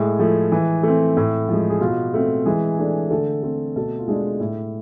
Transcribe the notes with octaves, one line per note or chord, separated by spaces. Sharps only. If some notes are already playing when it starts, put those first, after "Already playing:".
Already playing: A2 G#3 G#4
F3 A3
E3
A3 C4
A2
F3 G#3
G#4
B2 F4
A3 C4
E3 G#3 G#4
A3 D4
D3 A3 A4
A3 C4
B2 A3 A4
F4
G#3 A3 D4 G#4
A2